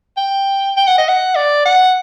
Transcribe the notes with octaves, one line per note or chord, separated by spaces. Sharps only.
G5
G5
F#5
D#5
F#5
D5
F#5